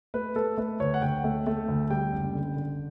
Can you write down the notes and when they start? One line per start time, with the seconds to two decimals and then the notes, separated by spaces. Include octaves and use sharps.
0.14 A3 B4
0.36 A3 A4
0.58 A3 B4
0.80 D2 C#5
0.94 F#5
1.02 D2 G5
1.24 A3
1.47 A3
1.68 D2
1.90 G3 G5
2.13 F#1
2.35 D3
2.56 D3